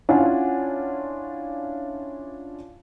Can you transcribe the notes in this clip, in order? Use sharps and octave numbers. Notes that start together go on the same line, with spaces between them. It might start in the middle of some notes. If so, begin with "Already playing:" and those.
C#4 D4 E4 F4 F#5 G#5